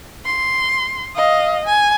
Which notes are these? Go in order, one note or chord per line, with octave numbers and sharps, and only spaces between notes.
C6
D#5 F5
G#5